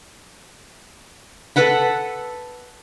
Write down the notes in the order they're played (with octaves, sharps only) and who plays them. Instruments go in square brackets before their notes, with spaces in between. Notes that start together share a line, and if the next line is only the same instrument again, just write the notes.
[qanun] A4 B4 F#5 B5